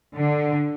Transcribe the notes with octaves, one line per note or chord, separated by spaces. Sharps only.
D3